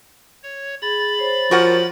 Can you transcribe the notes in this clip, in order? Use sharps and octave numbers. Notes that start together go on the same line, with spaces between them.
C#5
G#4 B5 A6
C5 C#5
F3 F#4 A#4 F#5